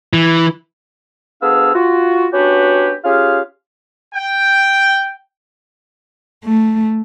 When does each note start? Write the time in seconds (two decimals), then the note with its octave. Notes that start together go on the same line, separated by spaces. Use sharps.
0.13 E3
1.42 D2 B3 D4 G#4 F5 E6
1.74 F4 F#4
2.33 B3 C#4 D4 F#4 G4 B4
3.04 C#4 F4 G4 G#4 F5
4.15 G5
6.45 A3